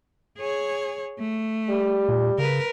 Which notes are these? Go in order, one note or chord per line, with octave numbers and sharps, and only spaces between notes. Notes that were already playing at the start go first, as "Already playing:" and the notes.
G#4 C#5
A3
G3
A#2
C#3 A#4 B4